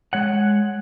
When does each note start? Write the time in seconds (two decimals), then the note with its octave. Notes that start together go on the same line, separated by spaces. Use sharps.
0.13 G#3 C#5 F#5